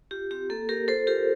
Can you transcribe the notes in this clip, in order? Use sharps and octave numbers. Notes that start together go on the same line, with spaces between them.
F4 G4
C4 G4
A#3 A4
A#3 G4 A#4
F4 A4 C5
F4 G4 A#4